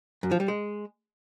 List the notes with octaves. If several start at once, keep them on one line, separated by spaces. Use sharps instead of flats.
F#2
F3
G3
G#3